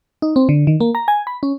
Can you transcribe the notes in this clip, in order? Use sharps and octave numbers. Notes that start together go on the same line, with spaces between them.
D#4
C4
D3
D#3
A#3
A#5
G#5
B5
C#4